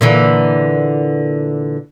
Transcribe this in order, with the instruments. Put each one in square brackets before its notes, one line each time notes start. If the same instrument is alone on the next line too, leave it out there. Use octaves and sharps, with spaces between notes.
[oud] A#2 D3 E3